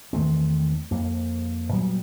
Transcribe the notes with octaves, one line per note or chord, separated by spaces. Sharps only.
E2 D#3 A3 C4
F2 A#3
A#2 F#3 G3 B3